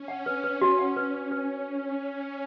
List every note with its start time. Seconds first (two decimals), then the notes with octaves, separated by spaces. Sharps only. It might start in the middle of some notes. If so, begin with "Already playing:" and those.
Already playing: C#4
0.08 F#5
0.26 B4
0.44 B4
0.61 C#4 F#4
0.79 F#5
0.97 B4
1.14 B4
1.31 B4